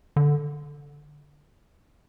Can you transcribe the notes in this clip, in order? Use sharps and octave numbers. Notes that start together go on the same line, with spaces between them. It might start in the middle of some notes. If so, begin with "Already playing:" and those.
D3